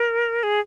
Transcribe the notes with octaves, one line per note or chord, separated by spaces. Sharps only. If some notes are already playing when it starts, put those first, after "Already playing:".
Already playing: A#4
G#4